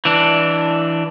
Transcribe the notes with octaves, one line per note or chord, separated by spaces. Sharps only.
E3 D4